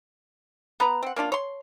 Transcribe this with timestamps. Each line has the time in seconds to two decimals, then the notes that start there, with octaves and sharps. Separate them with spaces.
0.80 B3 B4 A#5
1.03 C4 F#5
1.16 A#3 C#4 D4 F4
1.32 C#5 C6